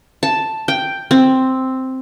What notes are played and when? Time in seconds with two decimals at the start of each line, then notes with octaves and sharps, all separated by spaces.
0.23 A5
0.68 G5
1.11 C4